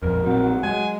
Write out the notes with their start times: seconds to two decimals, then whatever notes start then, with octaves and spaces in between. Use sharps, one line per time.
0.03 A#1 F2 A#4
0.24 A#1 F#3 C4
0.63 G#3 G#5